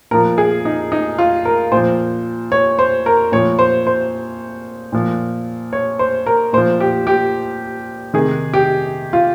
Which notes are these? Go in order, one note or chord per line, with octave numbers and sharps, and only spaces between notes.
A#2 F3 A#4
G#4
D#4
D#4
F4
A#4
A#2 F3 C5
C#5
C5
A#4
A#2 F3 C#5
C5
C5
A#2 F3
C#5
C5
A#4
A#2 F3 C5
G4
G4
C3 D#3 G#4
G4
F4